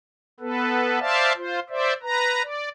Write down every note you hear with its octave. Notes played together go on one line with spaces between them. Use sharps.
B3 A4 B4
C5 D5 E5 F5 A5
F4 C5
C5 D5 E5
B4 A#5
D5